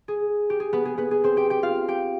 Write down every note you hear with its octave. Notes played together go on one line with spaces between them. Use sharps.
G#4
G4
G#4
B3 B4
G#4
B3 B4
G#4
C4 C5
G4 G5
G4 G5
F4 F5
G4 G5